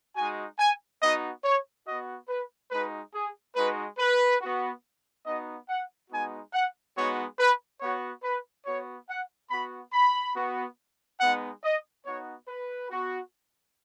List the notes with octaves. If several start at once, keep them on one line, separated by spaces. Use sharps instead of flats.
G#3 D#4 F#4 G#5
G#5
B3 D#4 F#4 D#5
C#5
B3 F#4 D#5
B4
G#3 D#4 F#4 B4
G#4
G#3 D#4 F#4 B4
B4
B3 F#4
B3 D#4 F#4 D#5
F#5
G#3 B3 D#4 F#4 G#5
F#5
G#3 B3 D#4 F#4 C#5
B4
B3 F#4 C#5
B4
B3 F#4 C#5
F#5
B3 F#4 B5
B5
B3 F#4
G#3 B3 D#4 F#5
D#5
B3 D#4 F#4 C#5
B4
B3 F#4